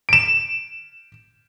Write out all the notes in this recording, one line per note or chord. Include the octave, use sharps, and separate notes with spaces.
D7 E7